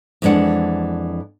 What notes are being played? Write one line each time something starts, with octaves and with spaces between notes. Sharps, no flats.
F2 E3 G#3 D4 F#5